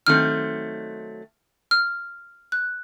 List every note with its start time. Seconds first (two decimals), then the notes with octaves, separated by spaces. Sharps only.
0.07 D#3 F#3 A3 C4 F6
1.71 F6
2.52 F#6